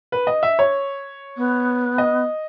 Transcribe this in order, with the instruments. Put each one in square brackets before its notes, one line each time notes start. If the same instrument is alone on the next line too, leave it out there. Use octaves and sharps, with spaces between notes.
[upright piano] B4
D#5
E5
C#5
[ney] B3
[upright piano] D#5